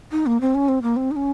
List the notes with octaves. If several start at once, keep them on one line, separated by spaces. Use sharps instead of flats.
D#4
A#3
C4
C#4
C4
A#3
C4
D#4
C#4